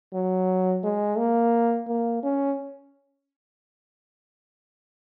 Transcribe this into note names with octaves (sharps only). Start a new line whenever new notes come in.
F#3
G#3
A#3
A#3
C#4